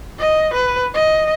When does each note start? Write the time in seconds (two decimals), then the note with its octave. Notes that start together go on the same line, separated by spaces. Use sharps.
0.19 D#5
0.54 B4
0.94 D#5